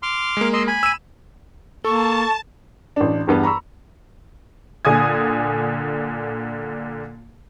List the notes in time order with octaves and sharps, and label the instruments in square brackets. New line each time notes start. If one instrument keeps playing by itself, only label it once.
[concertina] C6 D6 F6
[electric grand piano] G#3 A#3
[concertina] D#5 C6 E6
G#5 B5
[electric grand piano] E6 D#7
[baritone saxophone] A#3 [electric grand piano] A4 [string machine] A5 [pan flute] C#6
[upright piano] A1 D4
E2 G2 B3
A#5 B5 C#6 E6
[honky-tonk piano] A#2 D3 G#5 D#6 G#6